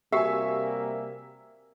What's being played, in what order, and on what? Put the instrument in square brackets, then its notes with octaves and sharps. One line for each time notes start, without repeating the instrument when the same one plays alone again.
[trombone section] C3 G3 A#3 [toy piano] F#4 G4 [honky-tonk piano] E5 G#5